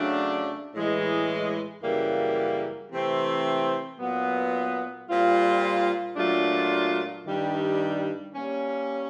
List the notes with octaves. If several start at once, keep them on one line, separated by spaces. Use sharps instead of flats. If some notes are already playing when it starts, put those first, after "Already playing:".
Already playing: C#3 F#3 A3 D4
A2 E3 G#3
F#2 C#3 E3 G3 A#3
C3 E3 A3 C4
A#2 F#3 B3
A#2 G3 C4 F4
A#2 F#3 A3 D4 F4
G2 D#3 G3
G3 A#3 C#4